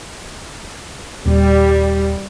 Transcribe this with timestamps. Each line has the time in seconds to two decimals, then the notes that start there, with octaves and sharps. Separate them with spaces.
1.26 D#1 G3